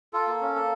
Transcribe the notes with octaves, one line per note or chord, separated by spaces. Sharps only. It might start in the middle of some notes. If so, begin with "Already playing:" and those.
F4 A4
A#3
C#4
A#3